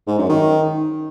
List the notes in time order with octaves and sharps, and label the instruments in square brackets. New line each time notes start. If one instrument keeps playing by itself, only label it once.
[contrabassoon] G#2
F#2
D#3